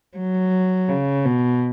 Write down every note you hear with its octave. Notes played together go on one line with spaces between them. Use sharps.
F#3
C#3
B2